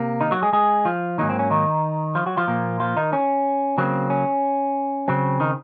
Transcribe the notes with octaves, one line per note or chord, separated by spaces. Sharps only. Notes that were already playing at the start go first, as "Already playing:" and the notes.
Already playing: C3 A#3
D#3 D#4
F#3 F#4
G#3 G#4
G#3 G#4
F3 F4
G#2 D#3 F#3 A#3 D#4
C4
C#4
D#3 D#4
F3 F4
F#3 F#4
F3 F4
A#2 F3 A#3
F3 F4
D#3 D#4
C#4
C#3 F#3 A#3 C4
C#4
C#3 F#3 C4
D#3 D#4